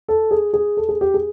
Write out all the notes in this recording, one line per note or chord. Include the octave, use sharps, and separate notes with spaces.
A4
G#4
G#4
A4
G#4
G4
G#4